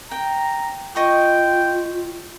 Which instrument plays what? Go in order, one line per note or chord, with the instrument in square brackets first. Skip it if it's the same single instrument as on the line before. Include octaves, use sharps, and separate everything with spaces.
[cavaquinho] G5 [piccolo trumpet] A#5
[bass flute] F4 [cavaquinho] D#5 C#6 D6 [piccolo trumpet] G5